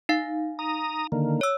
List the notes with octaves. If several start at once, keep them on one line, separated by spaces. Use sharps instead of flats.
D#4 F5
A#5 D#6
D3 D#3 A#3
C#5 E6